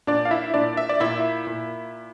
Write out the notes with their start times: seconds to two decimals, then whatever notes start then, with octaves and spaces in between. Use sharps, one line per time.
0.07 A#2 D4 D5
0.25 F5
0.31 E4 E5
0.54 A#2 D4 D5
0.77 E5
0.89 D5
1.00 A#2 E4 E5
1.47 A#2